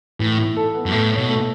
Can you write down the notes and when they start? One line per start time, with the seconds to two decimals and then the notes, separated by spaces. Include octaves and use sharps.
0.20 A2 E3
0.38 E4
0.56 A4
0.74 B3
0.86 F#2
0.92 A2 A3
1.10 C#5
1.17 B2
1.29 A3